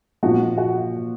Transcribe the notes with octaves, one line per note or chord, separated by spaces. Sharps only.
A#2 F3 F#4
F#4